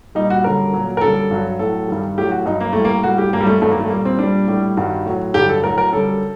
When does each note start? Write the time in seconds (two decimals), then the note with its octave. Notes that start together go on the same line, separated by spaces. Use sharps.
0.15 A#2 G3 D#4
0.30 F#4
0.44 F#2 D3 G3 A#4
0.73 A#2 F#3
0.97 A#4
1.01 F#2 D3 G3 A4
1.31 G2 F#3
1.59 A2 F#3 A4
1.88 G2 D#3 G3
2.18 A2 F#3 G4
2.31 F#4
2.46 G2 F#3 D#4
2.60 A#3
2.73 A2 G3 A3
2.85 A#3
3.03 A2 G3 F#4
3.18 G4
3.33 G2 F#3 A#3
3.41 G3
3.47 A3
3.61 G2 D#3 F#3 A3
3.71 A#3
3.80 A3
3.90 A#2 G3 A#3
4.05 C4
4.19 A#2 G3 D4
4.47 A2 G3
4.77 G2 D#3 G3 F#4
5.06 A2 F#3
5.34 G2 D3 F#3 G4
5.49 A4
5.63 A2 F#3 A#4
5.78 A#4
5.92 F#2 D3 G3 A4